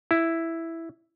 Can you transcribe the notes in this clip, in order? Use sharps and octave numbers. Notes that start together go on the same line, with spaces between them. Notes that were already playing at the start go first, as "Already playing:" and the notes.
E4